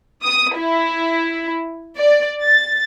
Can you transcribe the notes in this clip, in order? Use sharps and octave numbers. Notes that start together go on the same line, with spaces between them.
D#6
E4
D5
A6